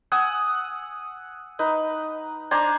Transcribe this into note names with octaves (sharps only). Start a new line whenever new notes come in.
F#5 G#5 D#6 E6
D#4 B4
D4 C5 G#5 A#5